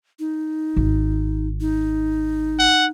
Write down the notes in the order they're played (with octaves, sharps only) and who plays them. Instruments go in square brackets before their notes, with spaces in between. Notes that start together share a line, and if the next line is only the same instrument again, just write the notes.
[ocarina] D#4
[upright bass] G#1
[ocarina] D#4
[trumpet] F#5